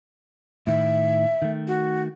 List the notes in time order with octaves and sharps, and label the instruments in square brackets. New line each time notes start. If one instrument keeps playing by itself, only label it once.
[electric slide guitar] A2 D#3 [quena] E5
[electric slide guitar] D#3 A3
[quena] F#4